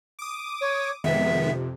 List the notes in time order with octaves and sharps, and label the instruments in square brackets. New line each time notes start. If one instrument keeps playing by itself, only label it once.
[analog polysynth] D6 D#6
[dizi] C#5
[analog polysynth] F2 C3 [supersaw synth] D#3 G#3 B3 [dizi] E5